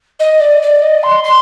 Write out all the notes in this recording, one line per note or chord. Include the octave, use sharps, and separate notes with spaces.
D#5
D5
D5
D#5
C6
C6